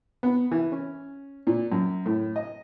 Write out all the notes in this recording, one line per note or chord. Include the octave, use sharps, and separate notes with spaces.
B3
E3
C#4
A#2
F#2
A2
D#5